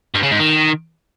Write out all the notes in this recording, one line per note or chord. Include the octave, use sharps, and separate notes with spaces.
G2
C#3
G#2
D#3